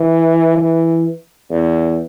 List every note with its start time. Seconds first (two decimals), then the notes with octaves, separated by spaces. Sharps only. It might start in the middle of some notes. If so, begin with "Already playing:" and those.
Already playing: E3
0.57 E3
1.50 E2